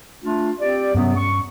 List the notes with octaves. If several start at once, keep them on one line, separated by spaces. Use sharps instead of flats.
A3 D4 F4
C4 G4 D5
G2 C3 F#3 B3 C#4
C#6